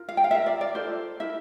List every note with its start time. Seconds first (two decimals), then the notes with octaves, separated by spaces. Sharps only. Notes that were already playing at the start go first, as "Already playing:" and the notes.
Already playing: F4 A#4
0.09 F5
0.17 G5
0.24 F5
0.31 F4 A#4 E5
0.46 D5
0.61 D5
0.75 F4 A4 C5
1.20 E4 A#4 E5